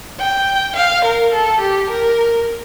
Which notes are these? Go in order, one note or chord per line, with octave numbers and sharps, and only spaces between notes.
G5
F5
A#4
A4
G4
A#4